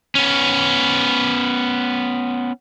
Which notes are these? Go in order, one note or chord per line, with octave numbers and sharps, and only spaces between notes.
B3 C#4